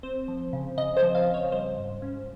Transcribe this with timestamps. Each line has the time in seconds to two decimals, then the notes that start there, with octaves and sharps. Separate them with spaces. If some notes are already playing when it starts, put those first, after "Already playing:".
0.03 C4 C5
0.28 F3
0.53 C#3
0.78 C#3 D#5
0.97 C5
1.03 F3
1.15 F5
1.27 C#3
1.34 C#5
1.52 G3 C5
1.77 G#2
2.02 C#4